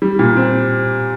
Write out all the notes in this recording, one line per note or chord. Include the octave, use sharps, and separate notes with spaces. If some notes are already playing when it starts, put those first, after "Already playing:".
G3
A#2
C4